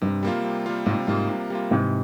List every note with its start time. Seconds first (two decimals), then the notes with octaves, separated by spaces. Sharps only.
0.01 G2 C3
0.23 G3 A#3 F4
0.44 C3
0.66 G3 A#3 F4
0.86 G#2 C3
1.07 G#2 G3 A#3 F4
1.29 C3
1.50 G3 A#3 F4
1.71 G#2 C3 E3